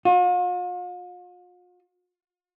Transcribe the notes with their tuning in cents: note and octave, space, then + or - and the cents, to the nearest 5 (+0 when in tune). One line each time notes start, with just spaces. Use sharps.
F4 +45